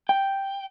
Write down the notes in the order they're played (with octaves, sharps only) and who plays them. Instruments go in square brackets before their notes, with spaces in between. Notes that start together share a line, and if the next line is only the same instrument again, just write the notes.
[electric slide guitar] G5